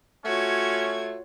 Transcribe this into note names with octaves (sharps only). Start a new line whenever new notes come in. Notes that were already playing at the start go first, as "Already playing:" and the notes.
A3 C#4 F4 F#4 C#5 G#6